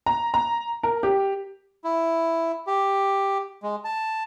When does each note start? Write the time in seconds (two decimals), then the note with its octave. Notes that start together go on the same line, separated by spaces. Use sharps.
0.06 A#5
0.34 A#5
0.83 A#4
1.03 G4
1.84 E4
2.67 G4
3.63 G#3
3.84 A5